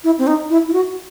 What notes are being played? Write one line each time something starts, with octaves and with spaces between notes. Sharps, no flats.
E4
C4
D#4
E4
E4
F#4